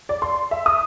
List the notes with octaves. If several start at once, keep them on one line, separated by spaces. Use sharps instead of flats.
D5
C6
E5
D#6